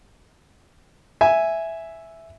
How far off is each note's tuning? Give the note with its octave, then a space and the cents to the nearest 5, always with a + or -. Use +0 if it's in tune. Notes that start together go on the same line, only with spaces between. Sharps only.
E5 +0 G#5 +0